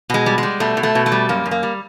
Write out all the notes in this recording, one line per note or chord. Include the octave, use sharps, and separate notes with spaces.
B2 G#3
G3
G3 G#3
B2 A3
B2
A3
B2
A3
G3
F#2 A#3
F#2
A#3
G3